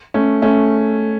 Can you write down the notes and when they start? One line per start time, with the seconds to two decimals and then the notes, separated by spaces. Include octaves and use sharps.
0.14 A3 C#4
0.42 A3 C#4